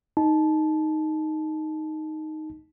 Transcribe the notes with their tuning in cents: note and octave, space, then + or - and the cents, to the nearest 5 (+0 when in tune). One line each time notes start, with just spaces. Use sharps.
D#4 +0 A5 -20